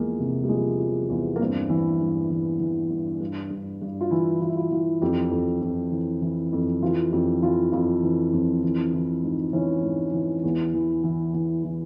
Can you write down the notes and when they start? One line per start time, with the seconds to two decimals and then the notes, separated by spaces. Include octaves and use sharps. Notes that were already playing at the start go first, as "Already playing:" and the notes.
Already playing: E2 F3 G#3 A#3
0.19 C3
0.44 G3
0.49 F3 G#3
0.80 F3
1.10 E2
1.36 A#3
1.40 G2 C4
1.70 E3
2.01 G2
2.31 E3
2.60 E3
2.91 G2
3.20 G2
3.50 G2
3.82 G2
4.01 F4
4.10 E3 E4
4.41 E3 F4
4.49 E4
4.56 F4
4.72 E3 F4
5.02 F2 G4
5.31 F2
5.61 F2
5.92 E3
6.21 E3
6.53 F2
6.82 E3 F4
7.12 F2 G4
7.42 E3 F4
7.72 F2 F4
8.03 E3
8.33 F2
8.63 E3
8.93 E3
9.23 G#2
9.53 E3 C#4
9.83 G#2
10.14 E3
10.44 E2
10.74 E3
11.04 E3
11.34 E3
11.64 E3